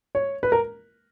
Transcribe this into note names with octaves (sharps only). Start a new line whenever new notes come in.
C#5
B4
A#4